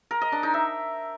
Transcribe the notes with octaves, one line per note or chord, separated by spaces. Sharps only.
A#4
D#5
D4
D#4
E5